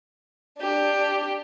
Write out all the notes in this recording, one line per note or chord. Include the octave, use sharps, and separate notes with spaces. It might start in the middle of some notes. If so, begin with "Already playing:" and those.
D4 G4